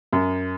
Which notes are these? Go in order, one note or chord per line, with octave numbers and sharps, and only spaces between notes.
F#2